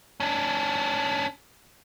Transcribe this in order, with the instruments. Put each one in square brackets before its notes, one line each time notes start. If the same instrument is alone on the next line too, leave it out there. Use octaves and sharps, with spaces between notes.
[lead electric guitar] C#4 D4